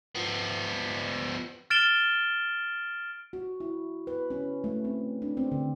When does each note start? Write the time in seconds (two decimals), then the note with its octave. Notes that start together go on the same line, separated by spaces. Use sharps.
0.15 F3 B3
1.70 F6 A6 D7 E7 G7
3.33 F#4
3.60 E4
4.07 B4
4.30 C#4
4.64 A3
4.85 C4
5.22 D4
5.37 C4
5.52 D3